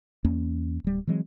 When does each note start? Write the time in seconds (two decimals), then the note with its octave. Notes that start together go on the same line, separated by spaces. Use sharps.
0.25 E2 A#3 C#4
0.84 D1 G3
1.07 E3 F#3 G#3 C4